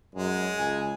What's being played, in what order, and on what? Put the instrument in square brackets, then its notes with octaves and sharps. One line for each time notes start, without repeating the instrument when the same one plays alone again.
[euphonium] F#2 [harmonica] G#3
[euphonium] C#2 [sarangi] G#5